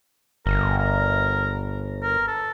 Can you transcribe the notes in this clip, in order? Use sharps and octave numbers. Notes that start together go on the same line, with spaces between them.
G1 A#4
A#4
A#4
A4